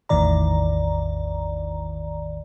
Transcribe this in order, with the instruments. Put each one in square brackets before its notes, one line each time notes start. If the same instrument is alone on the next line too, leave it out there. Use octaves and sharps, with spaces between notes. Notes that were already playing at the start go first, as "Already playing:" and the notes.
[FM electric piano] A1 E2 A2 D#3 D5 A#5